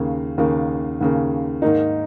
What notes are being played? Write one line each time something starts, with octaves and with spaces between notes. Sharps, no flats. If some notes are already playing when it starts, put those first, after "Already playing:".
Already playing: D#2 C#3 A#3
D#2 C#3 A#3
D#2 C#3 A#3
G#2 D#3 A#3 D#4